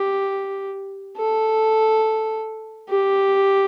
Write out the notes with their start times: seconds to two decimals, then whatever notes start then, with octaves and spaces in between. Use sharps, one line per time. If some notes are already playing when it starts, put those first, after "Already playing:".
Already playing: G4
1.17 A4
2.89 G4